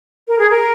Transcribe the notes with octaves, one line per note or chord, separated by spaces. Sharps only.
A#4
G#4
A#4